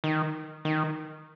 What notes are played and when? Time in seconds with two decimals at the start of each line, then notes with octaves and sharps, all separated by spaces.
0.04 D#3
0.65 D#3